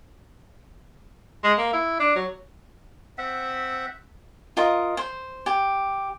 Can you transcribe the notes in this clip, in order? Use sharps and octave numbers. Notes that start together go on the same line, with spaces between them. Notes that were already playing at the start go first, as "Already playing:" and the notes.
G#3
A#3
E4
D4
F#3
C4 E5 F#5
F4 A#4 D#5
C5
G4